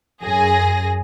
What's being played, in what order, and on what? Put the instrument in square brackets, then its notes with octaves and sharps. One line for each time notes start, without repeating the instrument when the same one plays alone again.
[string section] F#2 G#4 A#6